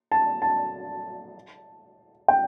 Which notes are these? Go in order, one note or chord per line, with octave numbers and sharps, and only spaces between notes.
A5
A5
G5